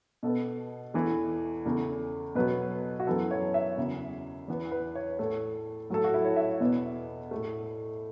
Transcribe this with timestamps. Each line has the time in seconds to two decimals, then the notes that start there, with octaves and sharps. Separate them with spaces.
0.23 B2 B3 A4
0.94 E2 E3 A3
1.65 E2 C#3 A3
2.35 B2 F#3 B3 B4
3.00 F#4
3.07 F#2 E3 B3 A4
3.31 C#5
3.54 E5
3.77 E2 C#3 F#3
4.48 E2 E3 B3
4.71 B4
4.95 C#5
5.19 A2 A3 A4
5.90 A2 F#3 A3 A4
6.04 F#4
6.14 E4
6.25 C#5
6.36 E5
6.60 E2 B2 B3
7.31 A2 A3